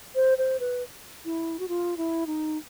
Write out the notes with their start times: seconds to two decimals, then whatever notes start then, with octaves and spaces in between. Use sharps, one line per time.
0.15 C5
0.38 C5
0.60 B4
1.25 E4
1.59 F#4
1.68 F4
1.97 E4
2.27 D#4